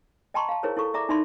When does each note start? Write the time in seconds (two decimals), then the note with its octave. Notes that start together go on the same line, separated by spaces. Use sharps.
0.34 D#5 G5 A5 A#5 C6 C#6
0.49 F5 A5
0.63 E4 G#4 A#4 C5 C#5
0.77 E4 A4 C#6
0.94 D5 E5 A#5 D6
1.09 D#4 E4 D5 E5 B5 C6